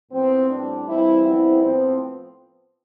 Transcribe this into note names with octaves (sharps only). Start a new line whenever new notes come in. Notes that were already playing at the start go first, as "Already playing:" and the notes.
A2 F3 B3 C4
A2 G3 C4 D4
G2 E3 G3 C4 E4
G2 F3 B3 C4 E4
A2 F3 B3 C4